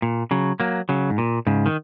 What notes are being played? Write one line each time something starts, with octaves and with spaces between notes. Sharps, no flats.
A#2
C#3 F#3
F#3 A#3
C#3 F#3
G#2
A#2
G#2 C#3
D#3